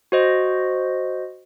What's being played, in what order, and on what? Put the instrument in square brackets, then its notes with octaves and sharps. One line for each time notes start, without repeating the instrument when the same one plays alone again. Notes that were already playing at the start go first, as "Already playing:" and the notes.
[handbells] F#4 C5 D#5